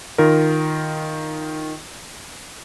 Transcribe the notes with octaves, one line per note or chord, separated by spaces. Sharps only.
D#3 F4 A#4